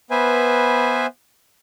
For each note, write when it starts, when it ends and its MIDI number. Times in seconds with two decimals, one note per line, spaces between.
0.11 1.06 59
0.11 1.06 71
0.11 1.06 72
0.11 1.06 76
0.11 1.06 80